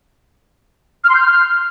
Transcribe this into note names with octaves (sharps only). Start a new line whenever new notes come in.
F6
C6
G6
F6